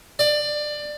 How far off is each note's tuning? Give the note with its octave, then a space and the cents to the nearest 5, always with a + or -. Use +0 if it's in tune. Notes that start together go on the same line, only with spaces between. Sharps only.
D5 +20